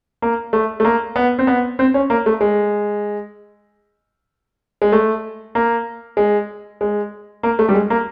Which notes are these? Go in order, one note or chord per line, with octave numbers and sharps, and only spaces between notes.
A#3
A3
A3
A#3
B3
C4
B3
C4
C#4
A#3
A3
G#3
G#3
A3
A#3
G#3
G#3
A#3
A3
G3
G#3
A#3